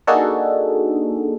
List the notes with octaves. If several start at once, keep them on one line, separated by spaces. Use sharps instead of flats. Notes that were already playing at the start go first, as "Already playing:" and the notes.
A#3 D4 D#4 F#4 G#4 A4